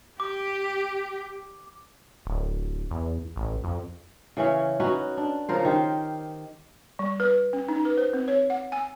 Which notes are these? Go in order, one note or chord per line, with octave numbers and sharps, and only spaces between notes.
G4 D6
D1
E2
A1
F2
C#3 E3 C#4
C#4 D#4 F#4 B4
D4
C#3 F3 A#4 C5
D#3 G4 C5
G3
B4
C#4
D#4
B4
C5
C4
C#5
F#5
G#5